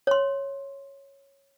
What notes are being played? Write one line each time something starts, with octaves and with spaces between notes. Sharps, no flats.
C#5 C6